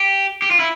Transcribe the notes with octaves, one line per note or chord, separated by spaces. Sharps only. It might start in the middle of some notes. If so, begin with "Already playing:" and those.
Already playing: G4
G4
F4
E4